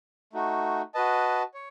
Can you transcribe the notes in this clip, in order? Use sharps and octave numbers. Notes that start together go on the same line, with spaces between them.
A3 D#4 F#4
F#4 B4 D#5 A5
C#5